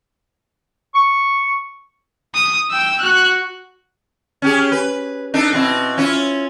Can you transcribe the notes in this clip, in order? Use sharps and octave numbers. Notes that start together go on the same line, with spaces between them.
C#6
D#6
G5 E6
F#4 F#6
C#4 G4 G#4
B4
D4 D#4 A4
B2 C4 E4
C#4 E4 F4